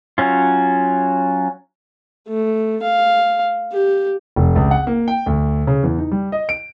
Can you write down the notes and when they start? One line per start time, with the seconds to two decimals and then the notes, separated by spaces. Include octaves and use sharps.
0.18 F#3 C#4 F4
2.28 A3
2.82 F5
3.73 G4
4.36 F1
4.56 C#2
4.71 F#5
4.87 A#3
5.08 G5
5.26 D2
5.67 C#3
5.83 E2
5.98 D#4
6.11 G3
6.32 D#5
6.49 D7